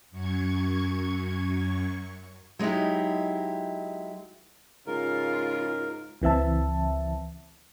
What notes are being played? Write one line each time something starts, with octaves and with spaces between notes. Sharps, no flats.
F#2 C#6 G#6
F#3 G#3 D#4 E4 G4
G#2 C#3 F4 A#4
C#2 E3 C4 E5 A5